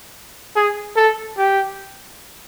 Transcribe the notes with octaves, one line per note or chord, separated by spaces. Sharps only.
G#4
A4
G4